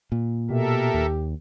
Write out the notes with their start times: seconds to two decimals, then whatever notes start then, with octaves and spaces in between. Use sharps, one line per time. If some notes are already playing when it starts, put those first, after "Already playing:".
0.12 A#2
0.50 B2 G4 A4 A#4 E5
0.94 D#2